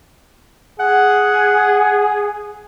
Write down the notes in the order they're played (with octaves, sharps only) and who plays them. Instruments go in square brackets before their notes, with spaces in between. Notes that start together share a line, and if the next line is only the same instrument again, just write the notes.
[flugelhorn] G#4 [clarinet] F#5